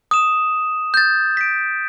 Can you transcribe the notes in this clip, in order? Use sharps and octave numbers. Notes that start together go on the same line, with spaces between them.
D#6 E7
G6 A6
B6 D7